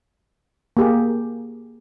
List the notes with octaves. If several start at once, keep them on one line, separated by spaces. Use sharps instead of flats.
A#3 G4 G#4